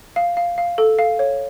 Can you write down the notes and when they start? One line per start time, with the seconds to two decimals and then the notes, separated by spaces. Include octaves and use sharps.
0.16 F5
0.37 F5
0.58 F5
0.78 A4
0.99 F5
1.19 C#5